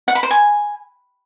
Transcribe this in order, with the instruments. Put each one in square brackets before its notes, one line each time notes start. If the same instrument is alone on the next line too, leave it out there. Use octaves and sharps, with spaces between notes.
[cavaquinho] F#5
B5
C5
G#5